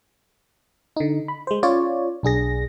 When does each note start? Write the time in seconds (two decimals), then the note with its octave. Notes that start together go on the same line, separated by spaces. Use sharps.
0.96 D3 D#4
1.28 B5
1.47 G#3 C5
1.63 C#4 F4 C#5 D5
2.23 B1 D4 G#4 A#6